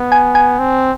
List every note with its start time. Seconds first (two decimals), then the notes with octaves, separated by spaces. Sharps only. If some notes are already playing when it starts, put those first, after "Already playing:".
Already playing: B3
0.12 G#5
0.35 G#5
0.59 C4